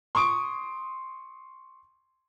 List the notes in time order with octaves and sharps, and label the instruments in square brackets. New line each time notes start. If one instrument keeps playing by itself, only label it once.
[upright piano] C6 C#6 D#6 D7